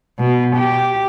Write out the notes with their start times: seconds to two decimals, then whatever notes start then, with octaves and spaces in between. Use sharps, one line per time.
0.19 B2
0.56 G4